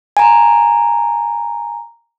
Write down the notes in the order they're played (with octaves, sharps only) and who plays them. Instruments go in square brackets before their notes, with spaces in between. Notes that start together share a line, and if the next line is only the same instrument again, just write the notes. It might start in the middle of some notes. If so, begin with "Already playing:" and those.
[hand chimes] G#5 A#5